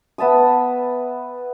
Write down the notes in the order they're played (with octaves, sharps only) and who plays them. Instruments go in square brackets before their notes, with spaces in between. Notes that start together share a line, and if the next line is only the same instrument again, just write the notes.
[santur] B3 E5 A5 D#6